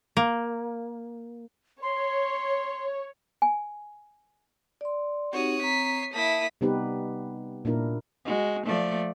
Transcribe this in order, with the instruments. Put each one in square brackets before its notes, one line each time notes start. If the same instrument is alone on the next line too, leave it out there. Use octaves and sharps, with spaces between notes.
[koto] A#3
[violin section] C#5 [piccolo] C6
[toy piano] G#5
[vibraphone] D5 C6
[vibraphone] C4 D#4 G4 [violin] F#4 [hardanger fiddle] C#5 D#6
[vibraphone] C4 A#5 [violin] B6 C7
[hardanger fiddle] A#3 E4 [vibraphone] A5 [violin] D#6 B6
[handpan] C3 G3 B3 D#4 G4 B4
A#2 D4 E4 A#4
[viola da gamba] G#3 F#4
F3 A3 D5